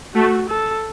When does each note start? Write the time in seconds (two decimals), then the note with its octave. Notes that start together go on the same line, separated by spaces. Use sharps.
0.15 A3 F#4
0.49 A4